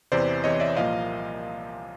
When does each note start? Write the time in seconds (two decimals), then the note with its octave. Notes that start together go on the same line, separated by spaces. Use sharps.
0.12 E2 C3 E3 C5 D5
0.44 E2 C3 E3 C#5 D#5
0.60 D5 E5
0.76 C2 A#2 F3 A#3 D#5 F5